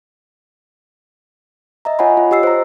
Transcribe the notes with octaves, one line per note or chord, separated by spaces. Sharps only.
D#5 E5 A#5
F4 C#5 D#5 F#5 G#5 B5
F4
G4 D#5 E6 C7
C5 A#5